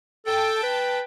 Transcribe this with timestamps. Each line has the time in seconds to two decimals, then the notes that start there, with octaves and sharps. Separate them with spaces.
0.26 A4 G5 A5
0.63 B4